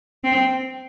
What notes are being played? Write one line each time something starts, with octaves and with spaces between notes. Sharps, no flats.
C4